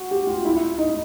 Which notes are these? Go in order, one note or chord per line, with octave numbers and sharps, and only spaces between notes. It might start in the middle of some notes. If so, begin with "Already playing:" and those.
Already playing: F#4
G4
F4
E4
D#4